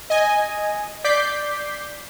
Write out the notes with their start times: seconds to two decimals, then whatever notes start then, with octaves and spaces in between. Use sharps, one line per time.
0.10 D#5 G#5
1.04 D5 D6 G6 B6 C7